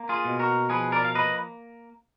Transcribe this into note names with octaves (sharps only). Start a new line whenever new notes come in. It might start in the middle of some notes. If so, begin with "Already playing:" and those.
Already playing: A#3
F4 G#4
B2
F#4 A#4
F3 G#4 B4
A#4 D5
F5
A#3 B4 D#5